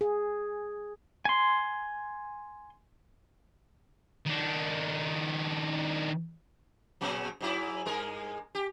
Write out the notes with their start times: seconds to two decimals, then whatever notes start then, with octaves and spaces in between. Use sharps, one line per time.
0.01 G#4
1.25 G#5 C6
4.26 D#3 D4
7.01 A#2 C#3 F#3
7.41 G#2 F#3 E4
7.86 G2 G#3 A#4
8.55 G4